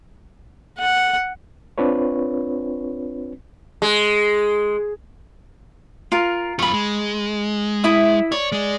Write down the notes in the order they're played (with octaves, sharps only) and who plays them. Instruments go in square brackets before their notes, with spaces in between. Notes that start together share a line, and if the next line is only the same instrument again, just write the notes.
[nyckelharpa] F#5
[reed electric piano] C4 D4 F4 B4 C#5
[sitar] G#3
[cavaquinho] F4 A#4
[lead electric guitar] F#2 F4 [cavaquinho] B5 C#6
[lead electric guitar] G#3
[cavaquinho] E4 E5 D#6
[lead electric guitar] C#5 [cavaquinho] D5
[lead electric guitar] G#3 G#4